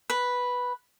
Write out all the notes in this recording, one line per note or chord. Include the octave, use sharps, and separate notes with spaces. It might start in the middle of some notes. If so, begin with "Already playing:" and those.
B4